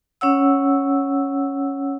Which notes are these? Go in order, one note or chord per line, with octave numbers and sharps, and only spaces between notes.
C#4 C#5 F#5 E6